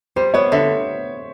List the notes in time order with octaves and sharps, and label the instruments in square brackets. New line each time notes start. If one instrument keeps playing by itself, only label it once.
[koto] G3 [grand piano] C5
[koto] B3 [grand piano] C#5
[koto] D3 [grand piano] E5